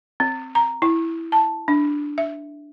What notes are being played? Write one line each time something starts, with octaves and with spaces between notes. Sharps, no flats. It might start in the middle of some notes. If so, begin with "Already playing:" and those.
C4
A#5
E4
A5
D4
E5